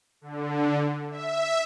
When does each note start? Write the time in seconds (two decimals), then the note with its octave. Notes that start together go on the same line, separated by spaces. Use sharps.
0.21 D3
1.10 E5